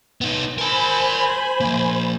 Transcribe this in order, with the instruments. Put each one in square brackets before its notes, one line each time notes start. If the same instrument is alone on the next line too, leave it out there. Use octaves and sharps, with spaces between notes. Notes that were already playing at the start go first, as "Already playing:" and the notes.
[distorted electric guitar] B3 D#4
[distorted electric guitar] A#4 A5 [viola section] C5 G#5 B5
[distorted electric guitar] F3 A#3